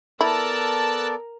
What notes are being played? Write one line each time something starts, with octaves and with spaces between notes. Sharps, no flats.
B3 E4 A4 A#4 D5 A5 E6 F#6